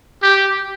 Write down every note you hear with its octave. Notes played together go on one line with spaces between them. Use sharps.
G4